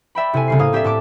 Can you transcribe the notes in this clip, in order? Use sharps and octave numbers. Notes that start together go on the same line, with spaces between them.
D5 E5 G5 B5
C3 E4 A4 G#5
C2 C#3 C7
A2 A#3 F5 D#6 G#6
C4 G4 D5 E5
A2 A5 D6 D7